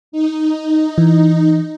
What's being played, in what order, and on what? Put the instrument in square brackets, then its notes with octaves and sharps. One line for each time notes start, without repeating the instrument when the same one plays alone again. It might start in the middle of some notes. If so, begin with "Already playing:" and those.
[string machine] D#4
[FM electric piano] E3